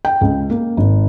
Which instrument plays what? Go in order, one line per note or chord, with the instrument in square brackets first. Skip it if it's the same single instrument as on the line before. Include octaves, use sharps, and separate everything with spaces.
[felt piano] G5
C#2
A#3
G#1